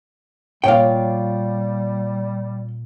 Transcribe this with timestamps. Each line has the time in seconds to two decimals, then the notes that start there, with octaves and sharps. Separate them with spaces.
0.64 A#2 G3 A#3 F4 C#5 F5 G5